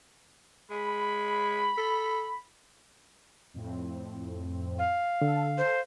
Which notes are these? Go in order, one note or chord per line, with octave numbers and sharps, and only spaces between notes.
G#3 B5
A4
F2 A2 C4
F5
D3 A4
A4 C5